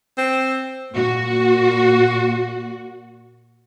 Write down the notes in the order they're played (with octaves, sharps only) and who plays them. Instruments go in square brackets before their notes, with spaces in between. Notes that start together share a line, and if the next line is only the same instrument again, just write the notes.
[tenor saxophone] C4
[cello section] A#2 F#4